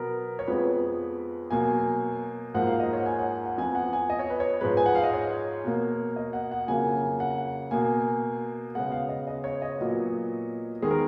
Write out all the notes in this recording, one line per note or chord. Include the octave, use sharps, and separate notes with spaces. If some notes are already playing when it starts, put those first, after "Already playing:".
Already playing: B2 F#3 B3 A#4
C#5
F2 F3 G#3 B3 B4
B2 F#3 A#3 G#5
G#2 F3 A#3 F#5
F5
D#5
C#5
F#5
G#5
F#5
F#5
F2 F3 B3 G#5
F#5
G#5
D#5
C#5
B4
C#5
G#2 F3 G#3 B4
G#5
F#5
F5
D#5
C#5
B2 A#3
D#5
F#5
F#5
F2 C#3 F#3 A#3 G#5
F#5
B2 A#3 G#5
C#3 G#3 B3 F#5
F5
D#5
D#5
C#5
D#5
A#2 F#3 B3
D#3 G#3 B3 G#4
A#4